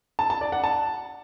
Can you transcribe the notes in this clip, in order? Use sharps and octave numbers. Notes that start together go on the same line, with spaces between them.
A5
A5
D5
F#5
A5